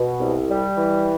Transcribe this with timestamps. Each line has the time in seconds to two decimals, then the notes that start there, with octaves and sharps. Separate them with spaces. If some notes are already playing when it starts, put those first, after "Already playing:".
Already playing: B2
0.19 C2
0.48 G3
0.78 E3